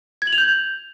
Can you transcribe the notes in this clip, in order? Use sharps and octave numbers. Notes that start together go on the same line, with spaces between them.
G#6
F#7
F7
G6